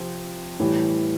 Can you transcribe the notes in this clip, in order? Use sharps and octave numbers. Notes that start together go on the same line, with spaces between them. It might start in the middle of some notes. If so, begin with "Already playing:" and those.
Already playing: C3 F3 C4
A2 E3 G3